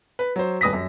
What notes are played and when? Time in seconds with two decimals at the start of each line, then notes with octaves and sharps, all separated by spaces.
0.19 B4
0.36 F#3 C5
0.61 D#1 B4 D#6 A#6 B6
0.73 F#2